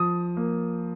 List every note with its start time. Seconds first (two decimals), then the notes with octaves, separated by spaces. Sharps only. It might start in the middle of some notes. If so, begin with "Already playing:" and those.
Already playing: F3 D#6
0.37 A#3